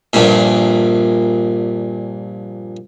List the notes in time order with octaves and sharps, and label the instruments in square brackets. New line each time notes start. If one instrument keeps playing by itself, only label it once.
[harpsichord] A#1 G2 A#2